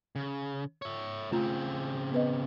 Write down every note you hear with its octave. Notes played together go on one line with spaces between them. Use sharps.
C#3
C#5 E5
C#3 A3 C4 F4 A#5
B3 B4 D#5